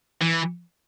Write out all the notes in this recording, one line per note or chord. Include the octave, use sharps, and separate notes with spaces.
E3